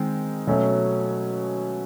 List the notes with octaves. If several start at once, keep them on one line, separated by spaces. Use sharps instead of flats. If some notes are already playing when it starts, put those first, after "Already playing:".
Already playing: D#3 G#3 C4
B2 F#3 A3 C#4